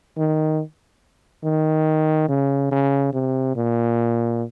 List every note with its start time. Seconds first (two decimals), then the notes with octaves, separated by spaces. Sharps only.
0.17 D#3
1.44 D#3
2.28 C#3
2.71 C#3
3.13 C3
3.56 A#2